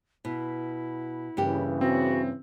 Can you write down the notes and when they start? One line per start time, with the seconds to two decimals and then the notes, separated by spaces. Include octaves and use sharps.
0.25 B2 E4
1.37 G2 C#3 E3 A#3 G4
1.81 C4 F#4